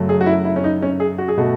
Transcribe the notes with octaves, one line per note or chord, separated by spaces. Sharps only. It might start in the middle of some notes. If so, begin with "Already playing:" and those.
Already playing: F#2 C#3 F#3 A3
G#4
F#4
E4
E4
C#4
D#4
C#4
G#4
F#4
G#4
B2 A3 F#4